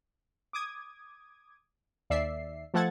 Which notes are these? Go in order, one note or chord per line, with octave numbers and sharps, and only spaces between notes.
D6 D#6 G#6
D#2 D5 E5 C7
F3 A3 A4 F#5 G#6 A6